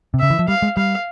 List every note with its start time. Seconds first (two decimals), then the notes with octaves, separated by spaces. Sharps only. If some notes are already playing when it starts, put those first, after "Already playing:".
0.14 C3
0.20 C#3 E5
0.30 E3
0.39 F3
0.48 G3 F5
0.62 G#3
0.77 G3 F5